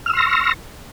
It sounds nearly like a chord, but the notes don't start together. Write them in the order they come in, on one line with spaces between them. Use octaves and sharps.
F6 E6 C6 A#6 C#6